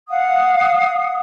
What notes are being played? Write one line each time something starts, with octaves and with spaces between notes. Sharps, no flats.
F5 F#5 D#6